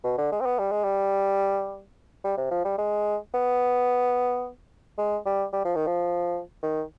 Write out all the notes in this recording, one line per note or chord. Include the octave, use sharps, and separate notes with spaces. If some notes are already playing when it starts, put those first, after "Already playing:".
B2
D3
G#3
C4
B3
G3
G#3
G3
G3
C3
F3
G3
G#3
B3
G#3
G3
G3
F3
D#3
F3
D#3